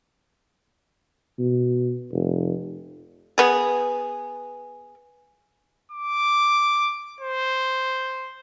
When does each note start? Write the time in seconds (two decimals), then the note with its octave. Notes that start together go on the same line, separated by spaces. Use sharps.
1.38 B2
2.12 F1
3.38 B3 G#4
5.91 D6
7.20 C5